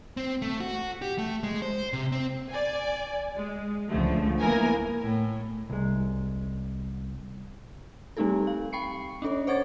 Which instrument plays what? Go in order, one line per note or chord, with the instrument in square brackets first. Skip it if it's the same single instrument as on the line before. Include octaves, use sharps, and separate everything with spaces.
[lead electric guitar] C4
A3
F#4
G4
A3
G#3
C5
C3
C4
[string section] D5 G#5
G#3
C#2 D3 F3 A3
A#3 B3 E4 A#4 G#5
[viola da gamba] A2
[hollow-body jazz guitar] C2 G#3
[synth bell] G3 A3 C4 D#4 G4 A4
F5
G5 B5 C#6 C7 C#7
C#4 D4 A4 C#5
C5 C#5 F#5 C#6 G#6 A6